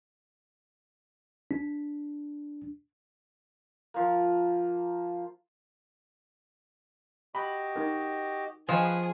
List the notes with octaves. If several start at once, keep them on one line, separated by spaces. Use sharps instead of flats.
D4
F3 A#3
F#4 G4 D#5 B5
D#4 A#4
F3 G#4 B4 C5 D#5 G5 G#5 C#6